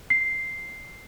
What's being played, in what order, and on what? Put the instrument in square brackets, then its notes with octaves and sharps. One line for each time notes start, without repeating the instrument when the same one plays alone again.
[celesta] C7